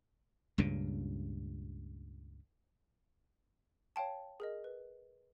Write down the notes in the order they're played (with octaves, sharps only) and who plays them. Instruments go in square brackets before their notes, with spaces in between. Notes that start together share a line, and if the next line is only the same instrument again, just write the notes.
[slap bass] C#2 G2 A#2 C#3
[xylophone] C#5 F5 G5 A5
G#4 A#4 D#5
B4